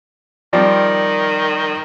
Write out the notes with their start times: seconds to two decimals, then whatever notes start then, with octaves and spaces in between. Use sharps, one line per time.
0.53 D#3 F3 G3 C4 D5